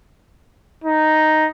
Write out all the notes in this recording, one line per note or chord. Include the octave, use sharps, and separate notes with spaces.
D#4